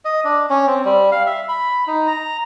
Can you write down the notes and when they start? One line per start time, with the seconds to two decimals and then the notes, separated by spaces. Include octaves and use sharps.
0.05 D#5
0.25 D4
0.50 C#4
0.67 C4
0.85 G3
1.12 F5
1.26 E5
1.48 B5
1.87 D#4
2.07 A#5